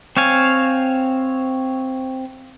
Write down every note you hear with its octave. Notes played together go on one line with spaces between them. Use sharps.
C4 C#5 F5 G#5